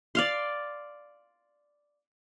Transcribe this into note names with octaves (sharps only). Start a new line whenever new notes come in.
D5 F5 C6